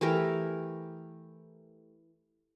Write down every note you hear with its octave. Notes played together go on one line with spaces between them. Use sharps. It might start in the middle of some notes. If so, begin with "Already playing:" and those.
E3 A3 G4 A#4